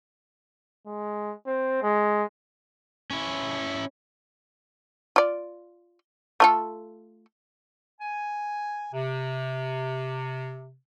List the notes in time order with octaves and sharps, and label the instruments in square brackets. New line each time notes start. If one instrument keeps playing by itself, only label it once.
[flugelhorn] G#3
C4
G#3
[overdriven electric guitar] C#4 E4
[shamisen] F4 D5
A3 F4 A4
[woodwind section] G#5
C3